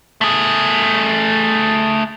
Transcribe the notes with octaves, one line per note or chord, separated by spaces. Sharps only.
A3 G#4